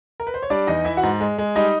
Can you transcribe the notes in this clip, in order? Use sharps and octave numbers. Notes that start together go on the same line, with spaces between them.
A#4
B4
C5
C#5
G3 D4 D5
E2 D#4 D#5
E3 E4 E5
F#4 F#5
G#2
G#3
G#3
G3 D#4 D#5